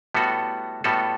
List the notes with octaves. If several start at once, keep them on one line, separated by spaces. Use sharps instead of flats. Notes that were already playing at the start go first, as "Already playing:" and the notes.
A2 G3 B3 F#4 A4
A2 G3 B3 F#4 A4